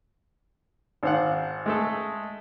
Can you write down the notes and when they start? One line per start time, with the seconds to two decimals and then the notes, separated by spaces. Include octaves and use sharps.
1.03 G#1 C5 F5 F#5
1.66 G#3 A3 A4